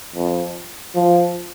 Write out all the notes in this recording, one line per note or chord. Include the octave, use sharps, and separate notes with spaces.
F2
F3